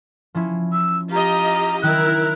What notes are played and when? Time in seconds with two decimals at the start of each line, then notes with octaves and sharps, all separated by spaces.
0.35 F3 C#4 E4
0.73 E6
1.12 F4 G4 D#5 A#5
1.82 D#3 F#3 E4 A#4 G5 F#6